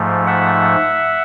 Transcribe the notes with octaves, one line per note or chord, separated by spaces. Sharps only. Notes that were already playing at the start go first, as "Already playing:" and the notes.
Already playing: G#2 F3 A3
E5 F#5